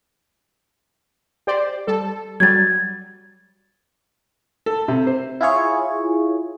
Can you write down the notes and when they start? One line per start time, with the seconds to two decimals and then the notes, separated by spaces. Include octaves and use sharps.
1.47 G4 C5 D5
1.87 G3 A4
2.40 F#3 G3 G#6 A6
4.66 A4
4.88 C3
5.07 C5
5.41 E4 F4 G#4 C#5